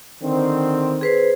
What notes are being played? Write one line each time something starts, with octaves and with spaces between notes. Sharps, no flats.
D3 D#3 C4
G#4 B4 C5